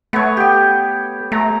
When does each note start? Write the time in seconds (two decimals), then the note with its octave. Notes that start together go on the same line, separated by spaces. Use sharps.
0.13 A3 B3 C#5
0.37 G4 G5
1.32 A3 A#5